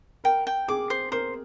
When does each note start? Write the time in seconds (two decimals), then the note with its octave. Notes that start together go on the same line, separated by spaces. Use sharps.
0.24 A#4 G5
0.47 G5
0.68 G#4 D6
0.90 C5
1.12 A#4 C5